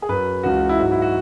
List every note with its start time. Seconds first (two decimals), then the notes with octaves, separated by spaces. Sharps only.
0.02 G#4
0.09 F#2 F#3 B4
0.43 C#2 C#3 E3 F#4
0.69 E4
0.79 G#2 F#3 F#4
0.91 E4
1.02 F#4